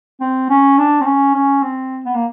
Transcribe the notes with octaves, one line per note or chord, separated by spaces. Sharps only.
C4
C#4
D4
C4
C#4
C#4
C4
B3
A#3